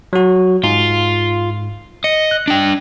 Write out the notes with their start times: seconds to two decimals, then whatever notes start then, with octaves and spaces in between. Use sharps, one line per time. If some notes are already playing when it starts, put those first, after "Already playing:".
0.13 F#3 F#4
0.64 G#2 F4
2.04 D#5 C#7
2.31 F#6
2.48 D4 G5